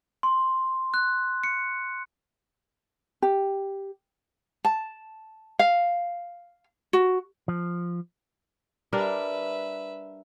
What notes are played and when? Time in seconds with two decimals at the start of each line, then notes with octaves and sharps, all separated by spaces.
0.23 C6
0.94 F#6
1.44 C#7
3.22 G4
4.65 A5
5.59 F5
6.93 F#4
7.48 F3
8.93 G3 D4 A#4 B4 E5